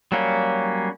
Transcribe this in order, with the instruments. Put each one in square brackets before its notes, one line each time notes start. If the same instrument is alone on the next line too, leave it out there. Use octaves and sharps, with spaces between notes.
[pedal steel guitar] F#3 G3 A#3 C#4